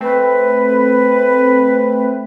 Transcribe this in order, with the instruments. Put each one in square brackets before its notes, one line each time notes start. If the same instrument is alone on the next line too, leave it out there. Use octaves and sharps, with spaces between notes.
[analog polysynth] A3 C4 [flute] B4